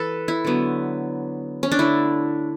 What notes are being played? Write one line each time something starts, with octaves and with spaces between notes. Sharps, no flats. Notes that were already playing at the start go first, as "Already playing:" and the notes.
Already playing: E3 A4 B4
E4
D3 F#3 B3
C#4
D4
D3 A3 E4